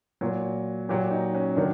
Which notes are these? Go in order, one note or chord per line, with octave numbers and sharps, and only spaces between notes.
A#2 F#3
A#2 F#3 G4
D#4
C#4
D#3 F#3 D4